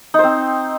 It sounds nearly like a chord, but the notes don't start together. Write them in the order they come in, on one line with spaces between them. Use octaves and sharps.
D#4 C5 C4